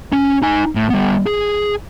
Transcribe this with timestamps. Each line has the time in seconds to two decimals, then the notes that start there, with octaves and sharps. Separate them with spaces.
0.12 C#4
0.42 D#4 G#5
0.75 A2
0.90 G3 B3
1.26 G#4